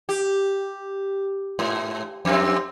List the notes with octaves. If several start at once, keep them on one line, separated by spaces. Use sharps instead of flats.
G4
G#2
F2 C4